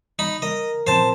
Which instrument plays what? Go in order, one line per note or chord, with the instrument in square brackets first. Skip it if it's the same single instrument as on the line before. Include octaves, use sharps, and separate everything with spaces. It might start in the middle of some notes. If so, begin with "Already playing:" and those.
[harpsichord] D#4 B5
[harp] A#4 [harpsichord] D#5
[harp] A#2 F3 C4 [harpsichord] C5 A5